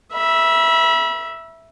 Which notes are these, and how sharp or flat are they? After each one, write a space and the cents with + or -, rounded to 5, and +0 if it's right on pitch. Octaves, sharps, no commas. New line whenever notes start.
E5 +0 B5 -35